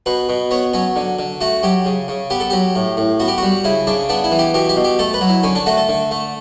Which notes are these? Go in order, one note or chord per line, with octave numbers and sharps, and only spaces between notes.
B2 B4
B2
B3 C#5
F#3 C#4
D3
D3
A3 F#4
F#3 G4
C#3
C#3
B3 G4
A4
F#3 G4
A2
A2
B3 F#4
G4
F#4
G3
C#3 E4
C#3 D4
B3 D4
E4
E3
G4
B2 G4
G4
B2
G4
A3 A4
B4
F#3
E4
D3 C#4
D4
A3 F#4
A4
D3
A3